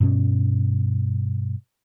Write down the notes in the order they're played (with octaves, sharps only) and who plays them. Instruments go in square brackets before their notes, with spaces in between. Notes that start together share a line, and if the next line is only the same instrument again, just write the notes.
[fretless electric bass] G2 B2 B3 C#4